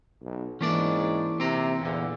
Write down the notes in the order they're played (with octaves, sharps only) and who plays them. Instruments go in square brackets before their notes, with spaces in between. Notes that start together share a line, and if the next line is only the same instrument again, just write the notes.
[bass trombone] B1
[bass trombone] G#2 [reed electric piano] E3 A#3 E4 [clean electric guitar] C#4 D4 D5
[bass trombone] C3 [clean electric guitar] C4 A#5
[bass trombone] E2 [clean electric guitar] A#2 D3